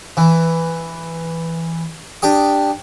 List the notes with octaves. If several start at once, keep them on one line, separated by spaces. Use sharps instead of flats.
E3
D4 G4 D#6